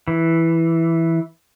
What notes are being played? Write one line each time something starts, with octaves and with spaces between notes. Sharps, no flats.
E3